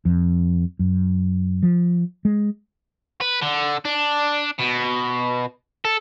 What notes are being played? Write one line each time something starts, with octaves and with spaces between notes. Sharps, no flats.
F2
F#2
F3
G#3
B4
D3
D4
B2
A4